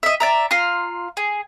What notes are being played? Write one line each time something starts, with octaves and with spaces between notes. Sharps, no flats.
D#5 E5
D5 E5 A#5
F4 A#5 C6
G#4